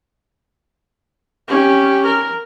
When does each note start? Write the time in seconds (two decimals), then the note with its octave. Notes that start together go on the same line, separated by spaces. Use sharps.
1.48 C#4 G4
2.06 A#4